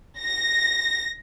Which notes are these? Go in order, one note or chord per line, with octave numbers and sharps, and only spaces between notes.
A#6